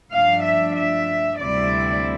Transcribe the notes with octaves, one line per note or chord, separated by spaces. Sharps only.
G2 F3 A3 D4 F5
E5
E5
D2 C3 G3 C4 E4 D5